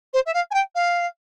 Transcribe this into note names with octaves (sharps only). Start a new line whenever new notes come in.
C5
E5
F5
G#5
G5
F5